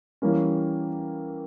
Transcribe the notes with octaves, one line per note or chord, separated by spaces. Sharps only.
E3 G3 A#3 C#4